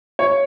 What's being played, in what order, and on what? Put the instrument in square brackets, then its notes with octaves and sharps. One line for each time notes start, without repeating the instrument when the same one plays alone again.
[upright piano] C#5